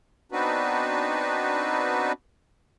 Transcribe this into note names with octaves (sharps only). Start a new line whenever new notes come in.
B3 C4 D4 D#4 F#4 B4